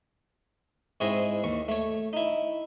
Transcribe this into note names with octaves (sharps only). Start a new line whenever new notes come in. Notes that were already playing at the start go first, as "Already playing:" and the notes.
G#2 G#3 C4 E4 C#5 D#5
D#2 C#6
A3 C#5
D#4 E4